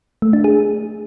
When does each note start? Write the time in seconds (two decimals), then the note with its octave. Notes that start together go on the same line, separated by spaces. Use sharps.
0.22 A3
0.33 D4
0.44 G#4